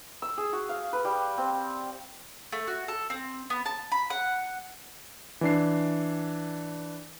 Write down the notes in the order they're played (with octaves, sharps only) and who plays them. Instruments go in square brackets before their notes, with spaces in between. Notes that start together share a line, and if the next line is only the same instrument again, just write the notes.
[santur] E6
G#4
F#4
F5
B4
G3
C4
[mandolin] A3
F#4
A4
C4
B3
A5
B5
F#5
[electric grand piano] E3 D4 C7